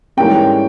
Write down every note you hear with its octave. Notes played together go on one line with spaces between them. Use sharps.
G#2 E3 G3 A#3 C#4 G5